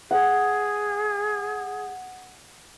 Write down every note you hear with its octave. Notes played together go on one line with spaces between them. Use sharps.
G#4 F#5